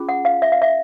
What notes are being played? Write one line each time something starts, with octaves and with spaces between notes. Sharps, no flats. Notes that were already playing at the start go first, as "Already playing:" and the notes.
Already playing: C#4 F4 G#4
F#5
F5
E5
F5
E5